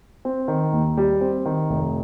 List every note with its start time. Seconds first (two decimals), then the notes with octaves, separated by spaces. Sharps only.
0.25 C4
0.48 D#3
0.73 D#2
0.97 G3
1.21 C4
1.45 D#3
1.70 F1